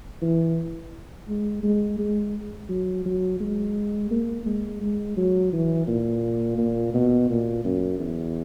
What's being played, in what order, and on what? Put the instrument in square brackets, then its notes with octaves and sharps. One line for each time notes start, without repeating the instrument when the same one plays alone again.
[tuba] E3
G#3
G#3
G#3
F#3
F#3
G#3
A#3
G#3
G#3
F#3
E3
A#2
A#2
B2
A#2
F#2
E2